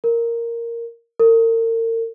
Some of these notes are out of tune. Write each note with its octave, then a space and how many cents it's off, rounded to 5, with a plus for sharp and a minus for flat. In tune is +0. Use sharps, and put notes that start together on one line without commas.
A#4 -5
A#4 -40